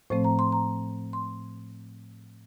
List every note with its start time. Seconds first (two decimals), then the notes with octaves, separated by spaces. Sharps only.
0.10 A2 F3 A3 C4 C5
0.24 A#5
0.39 C6
0.52 A#5
1.13 C6